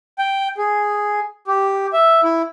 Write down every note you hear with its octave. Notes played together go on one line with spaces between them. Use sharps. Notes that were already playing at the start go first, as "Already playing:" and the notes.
G5
G#4
G4
E5
E4